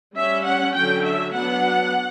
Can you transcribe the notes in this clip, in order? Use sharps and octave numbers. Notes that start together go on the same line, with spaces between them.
G3 C#4 E5
F#5
D3 F#3 C#4 G5
E5
F#3 B3 D4 F#5